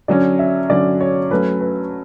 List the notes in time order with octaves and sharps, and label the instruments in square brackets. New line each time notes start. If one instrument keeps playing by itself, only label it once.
[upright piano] D3 F#3 C#4 [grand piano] D5
[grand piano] E5
[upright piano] D3 F#3 C#4 [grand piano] D5
[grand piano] C#5
[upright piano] F#3 A3 C#4 [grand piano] B4
[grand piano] B4